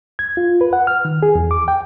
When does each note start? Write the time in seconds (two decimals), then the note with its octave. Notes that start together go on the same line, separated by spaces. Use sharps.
0.19 G#6
0.37 F4
0.61 B4
0.73 F#5
0.87 F6
1.05 D#3
1.23 G#4
1.35 E2
1.51 D6
1.68 G5